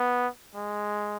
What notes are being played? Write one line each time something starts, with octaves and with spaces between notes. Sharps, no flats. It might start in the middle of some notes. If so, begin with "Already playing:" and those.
Already playing: B3
G#3